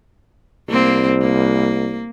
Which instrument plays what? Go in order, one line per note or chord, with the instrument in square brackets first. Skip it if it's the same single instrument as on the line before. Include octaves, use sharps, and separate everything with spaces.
[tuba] C2 [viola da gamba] A#3 C4
[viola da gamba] A#3